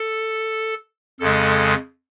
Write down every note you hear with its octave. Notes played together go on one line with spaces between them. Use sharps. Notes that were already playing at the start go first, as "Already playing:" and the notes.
Already playing: A4
F2 C#3 G#3 A4